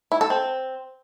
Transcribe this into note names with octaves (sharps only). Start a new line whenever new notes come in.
E4
A4
C4